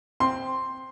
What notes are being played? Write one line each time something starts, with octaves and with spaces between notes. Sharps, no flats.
C4 C6